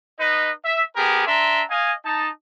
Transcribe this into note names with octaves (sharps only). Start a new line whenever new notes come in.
D#4 B4 D#5
E5
B3 G4 G#4 A#4
D4 E5 A#5 C6
D#5 F5 G#5
D#4 A5